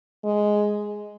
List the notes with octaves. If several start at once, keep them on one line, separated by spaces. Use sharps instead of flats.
G#3